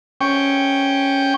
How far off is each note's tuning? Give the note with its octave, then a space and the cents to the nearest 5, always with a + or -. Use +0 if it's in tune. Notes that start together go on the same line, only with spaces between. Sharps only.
C#4 +0 G5 +0 C#6 +0